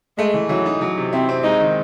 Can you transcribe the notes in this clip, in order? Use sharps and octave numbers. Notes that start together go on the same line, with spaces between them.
G#3 A3
E3
E3 F#3
D#4
F#3
C3
C4 E4
C4
G#3 D#4
D#3